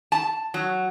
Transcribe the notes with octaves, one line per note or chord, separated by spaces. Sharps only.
A5
F#3